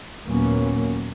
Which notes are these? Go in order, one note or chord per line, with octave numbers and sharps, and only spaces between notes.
D#2 A#2 F#3 A#3 B3 C#4